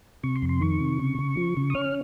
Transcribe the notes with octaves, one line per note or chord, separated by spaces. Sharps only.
C3 C#6
C6
F2
C6
D#3 C#6
C3
C#3
C#3
F3
C#3
D#6
C#4 F6